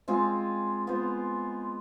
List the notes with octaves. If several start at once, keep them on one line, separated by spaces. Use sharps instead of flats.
G#3 C4 F4 G#4
B3 F4 C5